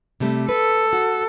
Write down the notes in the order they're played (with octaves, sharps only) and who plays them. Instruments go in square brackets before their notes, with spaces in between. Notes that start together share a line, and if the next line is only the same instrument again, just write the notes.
[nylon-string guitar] C3 G3 A3
[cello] A4 [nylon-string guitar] B4
[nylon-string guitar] F#4